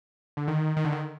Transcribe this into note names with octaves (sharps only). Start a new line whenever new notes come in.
D3
D#3
D#3
D3
D#3